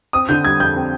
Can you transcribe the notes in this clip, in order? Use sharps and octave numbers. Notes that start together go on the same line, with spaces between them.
C4 D#6
D3 G6
G3 G#6
F2 G6
C4